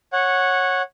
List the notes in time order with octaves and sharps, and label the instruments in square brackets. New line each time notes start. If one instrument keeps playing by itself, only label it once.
[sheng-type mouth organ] C#5 F#5